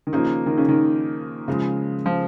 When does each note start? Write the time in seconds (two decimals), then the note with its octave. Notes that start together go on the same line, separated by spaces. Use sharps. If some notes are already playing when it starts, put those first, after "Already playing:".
0.07 D#3
0.13 C#3 F3 A#3 D#4
0.46 D#3
0.58 C#3
0.69 D#3
1.48 C#3 F3 G#3
2.06 F3